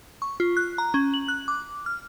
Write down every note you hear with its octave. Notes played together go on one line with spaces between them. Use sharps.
C#6
F4
F#6
A#5
C#4
F#7
F#6
D6
F6